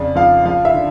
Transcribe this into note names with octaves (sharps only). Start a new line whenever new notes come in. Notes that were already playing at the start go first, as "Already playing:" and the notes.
Already playing: F2 C#3 D5
F3 F5
F3 F5
E5
D3